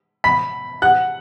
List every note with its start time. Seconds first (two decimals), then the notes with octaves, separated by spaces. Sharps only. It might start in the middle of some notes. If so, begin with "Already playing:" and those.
0.24 B5 B6
0.82 F#5 F#6